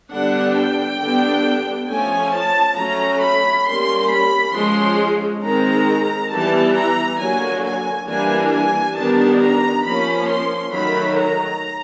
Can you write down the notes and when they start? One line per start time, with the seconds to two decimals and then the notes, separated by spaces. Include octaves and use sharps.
0.12 D3 G3 B3 D4 F#5
0.57 G5
1.00 D3 G3 B3 D4
1.89 F3 A3 C#4 G#5
2.34 A5
2.77 F#3 A3 C#4 A#5
3.21 B5
3.66 G3 A#3 C#4 C6
4.10 B5
4.54 F3 G#3 C#4 C6
5.43 D#3 G#3 C4 A#5
6.31 E3 G3 B3 A5
6.75 A#5
7.19 D3 F#3 A#3 G#5
7.64 G#5
8.08 E3 G3 A#3 D4 G#5
8.52 G#5
8.97 D#3 G3 B3 D4 A5
9.41 A#5
9.85 F3 A#3 C#4 B5
10.28 C6
10.73 D#3 F#3 A3 B5
11.18 A#5